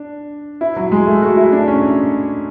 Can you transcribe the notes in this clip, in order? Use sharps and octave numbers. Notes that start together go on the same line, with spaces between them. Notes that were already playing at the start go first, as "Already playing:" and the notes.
Already playing: D4
E4
F#3
G#3
A3
F#4
E4
D4
C#4